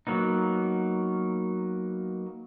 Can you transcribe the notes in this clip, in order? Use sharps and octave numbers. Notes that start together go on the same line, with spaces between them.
F#3 A#3 B3 D#4